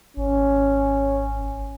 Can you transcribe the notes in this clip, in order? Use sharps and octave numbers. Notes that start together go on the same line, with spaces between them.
G#1 C#4